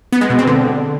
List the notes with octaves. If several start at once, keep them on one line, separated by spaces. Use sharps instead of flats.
B3
G#3
B2
C4
D3